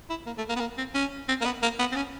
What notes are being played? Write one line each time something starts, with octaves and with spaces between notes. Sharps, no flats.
E4
A#3
A3
A#3
B3
A#3
C4
C#4
C4
A#3
B3
A#3
B3
C4
C#4